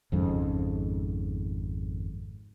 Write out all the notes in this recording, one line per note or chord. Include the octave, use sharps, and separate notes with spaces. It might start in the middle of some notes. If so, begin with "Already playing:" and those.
G#1 F2 G#2 C#3